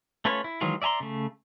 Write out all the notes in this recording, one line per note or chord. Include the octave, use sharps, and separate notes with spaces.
A3 C#4 F4 B4 C#5
E4
D#3 E3 F#3 G#3 F4
D5 E5 G#5 A#5 C6
C#3 A3